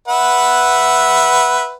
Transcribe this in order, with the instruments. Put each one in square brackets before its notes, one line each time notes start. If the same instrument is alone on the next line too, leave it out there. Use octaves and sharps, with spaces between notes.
[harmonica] B4 E5 F#5